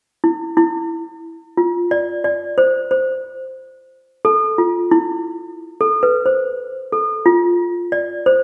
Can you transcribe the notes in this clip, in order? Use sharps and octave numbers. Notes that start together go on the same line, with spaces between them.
E4
E4
F4
D5
D5
C5
C5
A4
F4
E4
A4
B4
C5
A4
F4
D5
C5